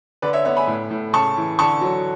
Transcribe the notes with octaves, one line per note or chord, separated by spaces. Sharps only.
D3 B4 D5
C#5 E5
B3 C#5 E5
G#5 B5
A2
A2
C#3 A5 C#6
E3
D3 A5 C#6
F#3